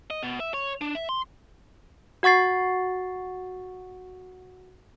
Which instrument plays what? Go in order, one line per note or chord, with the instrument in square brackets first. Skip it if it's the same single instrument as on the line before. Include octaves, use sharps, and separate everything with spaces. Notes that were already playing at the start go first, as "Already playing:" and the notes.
[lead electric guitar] D#5
B2
E5
C#5
D4
E5
C6
[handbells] F#4 F#5 C#6 A6 C7